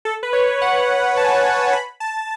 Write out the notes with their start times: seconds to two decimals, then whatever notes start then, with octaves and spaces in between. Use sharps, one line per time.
0.05 A4
0.23 B4
0.33 C#5
0.62 F#5
1.17 A5
1.24 G#5
1.31 A5
1.45 A5
1.73 B5
2.00 A5